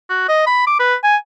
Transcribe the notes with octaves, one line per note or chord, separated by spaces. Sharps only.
F#4
D#5
B5
D6
B4
G#5